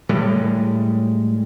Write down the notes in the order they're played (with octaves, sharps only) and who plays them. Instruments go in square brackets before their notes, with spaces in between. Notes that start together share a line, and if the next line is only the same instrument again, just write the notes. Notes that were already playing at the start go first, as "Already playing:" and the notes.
[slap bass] A2 G3 G#3